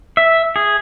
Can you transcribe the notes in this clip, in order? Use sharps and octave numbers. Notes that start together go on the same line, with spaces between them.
E5
G#4